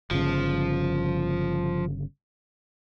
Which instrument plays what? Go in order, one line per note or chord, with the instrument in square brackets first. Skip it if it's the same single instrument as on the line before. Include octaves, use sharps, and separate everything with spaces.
[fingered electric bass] G1 C#3 [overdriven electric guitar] F3